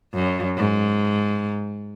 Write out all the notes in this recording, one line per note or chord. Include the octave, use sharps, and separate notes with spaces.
F#2
G#2